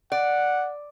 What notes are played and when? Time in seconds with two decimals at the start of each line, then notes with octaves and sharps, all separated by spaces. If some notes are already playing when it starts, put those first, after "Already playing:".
0.12 D5 F#5